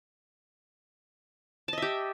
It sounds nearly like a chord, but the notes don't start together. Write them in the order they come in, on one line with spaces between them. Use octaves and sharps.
A5 D#5 E5 G4